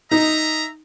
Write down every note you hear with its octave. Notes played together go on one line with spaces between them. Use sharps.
D#4 D#5 E5 A#5